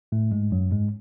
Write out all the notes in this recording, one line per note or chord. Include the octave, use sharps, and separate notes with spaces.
A2 A3
G#2 G#3
F#2 F#3
G#2 G#3